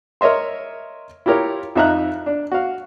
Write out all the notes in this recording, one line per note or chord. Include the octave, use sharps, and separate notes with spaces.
A#4 C#5 D#5 E5 C6
E4 F4 G4 A#4 C#5
F2 D#4 E5 A#5 F#6
D4
F#4 F5